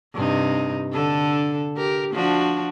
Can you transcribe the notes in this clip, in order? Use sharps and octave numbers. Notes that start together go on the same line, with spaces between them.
G2 C3 D#4
D3 A4
G4 A#4
F3 D4 F#4